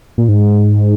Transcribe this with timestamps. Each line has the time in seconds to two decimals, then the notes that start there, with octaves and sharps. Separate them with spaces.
0.18 A#2
0.28 G#2